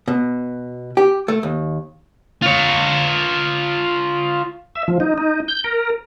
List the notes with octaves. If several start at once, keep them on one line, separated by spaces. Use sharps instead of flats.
B2
G4
A3
D#2
F4 C#5
E5
F3
D#4
D#4
G6
A#4